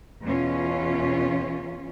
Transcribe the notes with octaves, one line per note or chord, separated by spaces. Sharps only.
E2 B2 C#4 F4